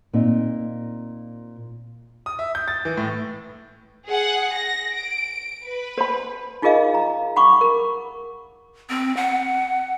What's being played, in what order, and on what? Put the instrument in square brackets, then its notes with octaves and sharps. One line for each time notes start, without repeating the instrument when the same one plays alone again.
[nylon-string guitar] A#2 C4 D#4
[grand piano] D#6
E5
G6
A6
E3
A2
[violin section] G#4 F#5
A#6
D7
B4
[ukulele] C5 B5
[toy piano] D#4 F4 G#4 A#4 D#5 F5
A#5
F#5 B5 C#6 D6
A#4
[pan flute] C4
F#5